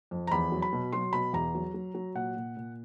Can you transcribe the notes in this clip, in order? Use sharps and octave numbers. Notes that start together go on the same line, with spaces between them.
F2
A#5
E2 B5
F#3
B5
B2
F#3 C6
B2 B5
E2 A#5
F#3
F#3
F#3
A#2 F#5
A#2
A#2